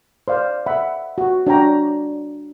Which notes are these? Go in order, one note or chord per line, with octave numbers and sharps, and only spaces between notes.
C5 D5 F5
E5 F#5 B5
F#4
D4 F#4 C#5 D5 G5 A#5